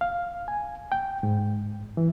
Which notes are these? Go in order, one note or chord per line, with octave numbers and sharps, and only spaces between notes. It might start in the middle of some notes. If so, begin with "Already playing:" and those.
F5
G#5
G5
G#2
E3